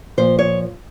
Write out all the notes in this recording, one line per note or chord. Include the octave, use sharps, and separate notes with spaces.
A#2 F3 C5
C#5